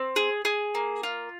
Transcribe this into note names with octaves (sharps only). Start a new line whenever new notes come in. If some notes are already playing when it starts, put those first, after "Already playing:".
Already playing: C4
G#4
G#4
A#3
F4